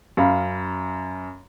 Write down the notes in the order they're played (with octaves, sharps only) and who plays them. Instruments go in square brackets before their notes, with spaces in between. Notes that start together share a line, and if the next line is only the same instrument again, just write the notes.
[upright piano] F#2 F5 B5